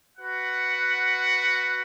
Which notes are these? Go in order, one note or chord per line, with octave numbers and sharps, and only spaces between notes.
F#4 B4 F#5